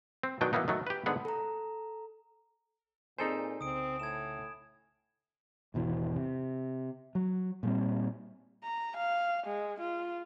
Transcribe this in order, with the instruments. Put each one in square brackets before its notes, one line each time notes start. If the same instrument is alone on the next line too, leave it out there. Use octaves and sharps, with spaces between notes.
[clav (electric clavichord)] C4
B2 D#3 F#3 D4 D#4 G5
E3 F#3 A#3 B3 D#4
D#3 F#3 A3
G4 B4
G#2 D3 B3 G#4 F#5
[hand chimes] A4 A#5
[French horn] A#2 [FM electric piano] C4 G#4 D5 [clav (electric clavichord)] D#4 A4 C5 [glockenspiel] G#5
[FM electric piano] C2 C#3 [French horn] C4 [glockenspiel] D#6 D7
[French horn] A2 [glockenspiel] G#6 E7
[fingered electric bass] G#1 E2 B2 E3
C3
F#3
A#2 G3 C4
[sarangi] A#5
F5
G#3
F4